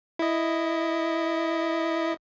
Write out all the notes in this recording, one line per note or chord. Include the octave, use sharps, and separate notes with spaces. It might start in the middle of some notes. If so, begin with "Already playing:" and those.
E4 D#5